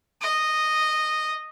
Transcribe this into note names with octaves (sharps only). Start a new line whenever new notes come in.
D#5